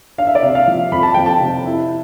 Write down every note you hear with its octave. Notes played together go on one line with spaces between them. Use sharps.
D4 F5
E5
D5
C3 E5
F5
F3
F2 B5
A5
F2 G5
A5
C3
E4